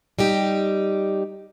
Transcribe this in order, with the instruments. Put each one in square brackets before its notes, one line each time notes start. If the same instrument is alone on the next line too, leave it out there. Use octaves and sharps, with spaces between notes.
[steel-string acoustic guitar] G3 D#4 G4